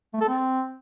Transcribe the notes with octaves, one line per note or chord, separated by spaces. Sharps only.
A3
A4
C4